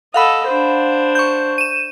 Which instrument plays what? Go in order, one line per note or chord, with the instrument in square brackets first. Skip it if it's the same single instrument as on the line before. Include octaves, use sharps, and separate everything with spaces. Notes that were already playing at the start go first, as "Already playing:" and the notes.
[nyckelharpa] A4 D#5 [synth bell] F5 F#5 B5
[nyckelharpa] D4 C5
[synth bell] C#6 G6
D#7 E7